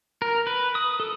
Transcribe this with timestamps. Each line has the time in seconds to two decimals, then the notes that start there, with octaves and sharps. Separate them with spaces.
0.22 A#4
0.47 B4
0.75 D#6
1.00 A4